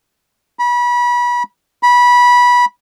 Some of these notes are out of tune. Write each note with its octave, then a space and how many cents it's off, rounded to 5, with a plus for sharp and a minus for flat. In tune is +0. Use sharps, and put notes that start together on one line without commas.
B5 -30
B5 -20